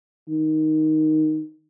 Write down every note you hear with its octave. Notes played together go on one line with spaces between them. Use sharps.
D#3